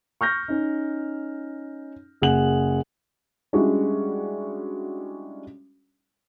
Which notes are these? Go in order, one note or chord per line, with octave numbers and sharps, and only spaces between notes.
C#6 F6 G6 A#6
C#4 D#4
F#1 G#4 F#5 F#7
G3 G#3 C#4 D4 E4 F#4